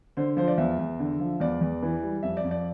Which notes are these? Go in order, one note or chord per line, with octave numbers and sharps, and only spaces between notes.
D3 C5
F3 C5
D5
E2 E5
E2
D3
F3
E2 D5
E2
E3
G3
F2 E5
D5
F2
D5